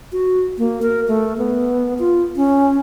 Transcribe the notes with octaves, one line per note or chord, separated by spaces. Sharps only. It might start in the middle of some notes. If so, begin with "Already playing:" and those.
F#4
A#3
A#4
A3
B3
F4
C#4